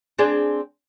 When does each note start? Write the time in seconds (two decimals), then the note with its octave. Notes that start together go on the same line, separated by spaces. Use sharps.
0.18 C4 D4 G#4